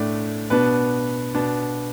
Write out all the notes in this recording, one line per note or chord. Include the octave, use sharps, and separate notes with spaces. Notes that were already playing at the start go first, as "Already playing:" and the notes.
Already playing: A2 A3 D4 D5
B2 B3 D4 B4
B2 B3 D4